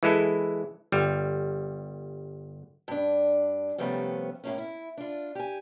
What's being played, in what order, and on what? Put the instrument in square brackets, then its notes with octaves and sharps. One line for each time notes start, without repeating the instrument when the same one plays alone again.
[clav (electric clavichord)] E3 G#3 E4 A4
G1 G3
[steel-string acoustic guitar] G2 D4
C3 F3 G3 A3 B3 C#4
A2 A#3 C#4
E4
D4 F4
G4 G#5